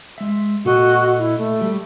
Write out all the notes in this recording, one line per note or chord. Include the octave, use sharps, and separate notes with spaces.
G#3 E5
A#2 F#4 A4 D#5
E4
A3
G3 G4